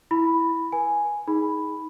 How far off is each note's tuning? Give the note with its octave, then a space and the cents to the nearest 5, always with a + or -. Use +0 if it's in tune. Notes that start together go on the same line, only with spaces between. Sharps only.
E4 +0 B5 +0
B4 -40 G#5 +0
D#4 +20 G#4 +0 B5 +0